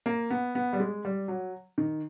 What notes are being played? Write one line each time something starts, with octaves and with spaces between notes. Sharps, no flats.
A#3
B3
B3
G3
G#3
G3
F#3
D#3